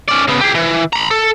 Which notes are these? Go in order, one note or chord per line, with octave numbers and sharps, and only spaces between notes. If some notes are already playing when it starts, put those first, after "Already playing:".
C#4 D5
C#3 B3
G4 G#4
E3
A#5 B5
A4